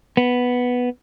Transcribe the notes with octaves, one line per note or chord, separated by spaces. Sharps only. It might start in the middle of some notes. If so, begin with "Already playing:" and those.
B3